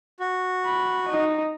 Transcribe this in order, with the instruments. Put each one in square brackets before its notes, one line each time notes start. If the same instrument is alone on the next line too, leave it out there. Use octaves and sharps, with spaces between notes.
[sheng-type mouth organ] F#4
[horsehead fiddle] B5
D#4 D#5